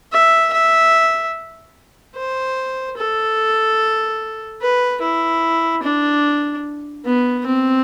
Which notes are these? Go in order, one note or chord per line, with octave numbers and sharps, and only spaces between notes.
E5
E5
C5
A4
B4
E4
D4
B3
C4